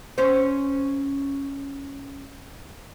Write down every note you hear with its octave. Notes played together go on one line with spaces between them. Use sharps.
C#4 C5